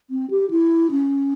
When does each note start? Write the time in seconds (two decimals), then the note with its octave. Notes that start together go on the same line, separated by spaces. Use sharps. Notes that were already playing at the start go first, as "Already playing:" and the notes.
0.10 C4
0.30 G4
0.51 E4
0.91 C#4